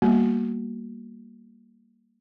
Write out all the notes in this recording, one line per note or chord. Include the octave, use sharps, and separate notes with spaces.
G3 A#3 B3 F#4